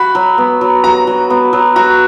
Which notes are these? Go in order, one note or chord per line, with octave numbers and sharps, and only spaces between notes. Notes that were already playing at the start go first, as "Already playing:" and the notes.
Already playing: F#4 B5
F#3
B3
F#3
F#4 A#5
F#3
B3
F#3
F#4 A#5